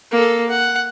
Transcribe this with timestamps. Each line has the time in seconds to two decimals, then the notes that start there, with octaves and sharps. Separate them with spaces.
0.11 A#3 A4
0.49 F#5